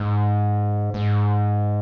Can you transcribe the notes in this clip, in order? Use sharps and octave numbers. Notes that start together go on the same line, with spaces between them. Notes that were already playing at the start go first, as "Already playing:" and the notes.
Already playing: G#2
G#2